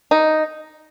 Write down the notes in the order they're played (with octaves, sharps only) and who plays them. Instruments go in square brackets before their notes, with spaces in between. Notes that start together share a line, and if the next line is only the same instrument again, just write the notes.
[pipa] D#4